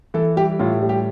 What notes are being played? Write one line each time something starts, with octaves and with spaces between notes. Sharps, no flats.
E3 A4
G3 G4
A2 F4
G3
G4